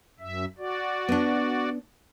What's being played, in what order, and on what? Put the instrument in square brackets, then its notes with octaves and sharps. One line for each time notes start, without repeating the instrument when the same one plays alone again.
[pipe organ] F#2 E5
F#4 D5
[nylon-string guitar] B3 D4